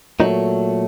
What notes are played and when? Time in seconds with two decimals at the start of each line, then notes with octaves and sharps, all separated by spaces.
0.20 A#2 F#3 A3 D#4